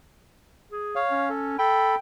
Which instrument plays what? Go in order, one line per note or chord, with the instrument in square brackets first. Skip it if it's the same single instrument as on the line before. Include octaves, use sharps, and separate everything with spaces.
[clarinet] G#4
[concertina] C#5 F5
[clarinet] C#4
[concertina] A4
[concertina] A4 B5 [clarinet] G5